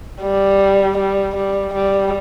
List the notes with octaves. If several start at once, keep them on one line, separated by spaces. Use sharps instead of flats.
G3
G3
G3
G3